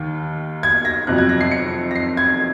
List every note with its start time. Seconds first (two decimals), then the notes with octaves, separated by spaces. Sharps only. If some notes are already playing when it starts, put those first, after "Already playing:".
Already playing: D#2 D#3
0.63 G#6
0.85 A#6
1.07 F2 C3 F#3 F#6
1.18 G#6
1.29 A#6
1.41 C7
1.51 C#7
1.91 A#6
1.96 C7
2.17 G#6